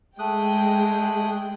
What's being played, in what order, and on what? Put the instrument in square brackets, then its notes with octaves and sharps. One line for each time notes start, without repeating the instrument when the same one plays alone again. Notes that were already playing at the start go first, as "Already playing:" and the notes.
[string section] G#3 G5 [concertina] A3 D#6 F#6